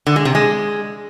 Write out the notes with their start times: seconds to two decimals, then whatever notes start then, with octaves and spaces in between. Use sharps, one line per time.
0.07 D3
0.16 G#3
0.25 C3
0.35 G#3